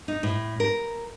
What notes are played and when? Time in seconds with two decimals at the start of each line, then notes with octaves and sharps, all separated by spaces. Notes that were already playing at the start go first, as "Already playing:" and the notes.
0.08 D#4
0.23 A2
0.60 A#4